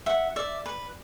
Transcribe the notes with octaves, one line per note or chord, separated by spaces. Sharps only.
E5 F#5
D5 E5
B4